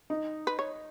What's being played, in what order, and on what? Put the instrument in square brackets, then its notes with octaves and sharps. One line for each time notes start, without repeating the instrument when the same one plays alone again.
[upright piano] D#4
[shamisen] B4
C#5